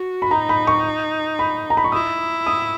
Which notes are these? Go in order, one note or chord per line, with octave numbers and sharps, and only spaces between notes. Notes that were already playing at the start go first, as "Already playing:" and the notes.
Already playing: F#4
B5
D#4 A#5
B5
C#6
B5
A#5
B5
C#6
E4 D#6
D#6